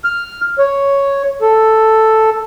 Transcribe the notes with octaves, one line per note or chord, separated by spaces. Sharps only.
F6
C#5
A4